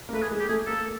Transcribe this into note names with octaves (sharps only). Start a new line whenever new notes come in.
A#3
A3 B4
G#4
G#3
G4
A3 G#4
A#3 A4